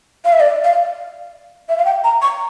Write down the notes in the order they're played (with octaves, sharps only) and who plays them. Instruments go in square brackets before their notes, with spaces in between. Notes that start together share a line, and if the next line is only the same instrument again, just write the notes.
[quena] F5
E5
D5
F5
E5
F5
G5
A#5
C#6